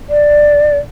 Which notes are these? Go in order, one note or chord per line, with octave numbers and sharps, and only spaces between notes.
D5